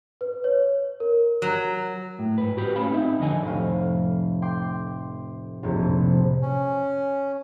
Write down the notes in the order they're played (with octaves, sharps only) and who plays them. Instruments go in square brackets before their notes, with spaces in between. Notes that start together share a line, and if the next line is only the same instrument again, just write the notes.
[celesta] B4
C#5
A#4
[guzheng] F#3
[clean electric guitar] A2
G#2 B4
F#4 G4 B4
A2 C#4 F5 B5
C4 D#4 E5
F2 D3 D#3 D#5 G#5
[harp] F1 A2 F5
G5 C6 D6 G6
F1 A#1 F2 A2 C3
[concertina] C#4